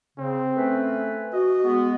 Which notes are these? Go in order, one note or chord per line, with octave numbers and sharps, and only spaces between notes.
C#3 C4
A3 C#4 B4
F#4 D#5
G#3 B3